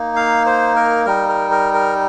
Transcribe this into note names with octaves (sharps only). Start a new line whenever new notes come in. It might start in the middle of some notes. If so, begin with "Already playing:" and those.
Already playing: A#3 D#4
F5
C5
A#4
G3 D#4 A#4
A#4
A#4
A#4